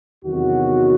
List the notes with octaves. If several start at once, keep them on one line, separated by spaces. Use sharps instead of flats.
E2 C3 D#3 F#3 B3 F#4